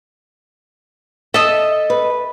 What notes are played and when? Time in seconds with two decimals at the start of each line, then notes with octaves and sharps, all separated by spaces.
1.34 A4 D#5 E5
1.90 B4